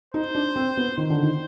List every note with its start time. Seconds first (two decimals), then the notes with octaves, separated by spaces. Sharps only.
0.14 D#4 C5
0.35 D4
0.56 C4
0.77 B3
0.98 D#3 C5
1.10 D3
1.23 D#3